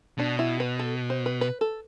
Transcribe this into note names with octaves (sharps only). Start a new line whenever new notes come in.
B2 D4
E4
B4
A4
C5
B4
B4
A4